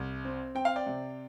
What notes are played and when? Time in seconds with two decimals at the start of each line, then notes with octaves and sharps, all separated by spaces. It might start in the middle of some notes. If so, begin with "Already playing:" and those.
Already playing: C2
0.25 C4
0.55 C4 G5
0.65 F5
0.76 D5 G5
0.86 C3